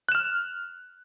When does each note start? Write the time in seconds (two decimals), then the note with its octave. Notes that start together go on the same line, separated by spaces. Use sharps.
0.09 F#6
0.12 E7
0.15 F6